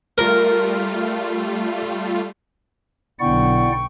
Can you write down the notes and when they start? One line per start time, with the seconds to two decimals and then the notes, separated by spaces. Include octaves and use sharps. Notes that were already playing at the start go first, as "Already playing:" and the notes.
0.18 G3 A3 F4 A#4
3.20 B1 D3 B3 E4 D5 F#5 G5 C#6